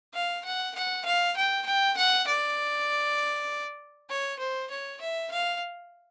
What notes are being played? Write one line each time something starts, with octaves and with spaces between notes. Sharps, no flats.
F5
F#5
F#5
F5
G5
G5
F#5
D5
C#5
C5
C#5
E5
F5